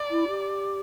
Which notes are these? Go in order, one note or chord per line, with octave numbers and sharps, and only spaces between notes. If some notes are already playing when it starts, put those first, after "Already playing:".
Already playing: D5
E4
G4